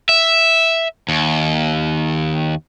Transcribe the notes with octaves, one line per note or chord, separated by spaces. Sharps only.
E5
D#2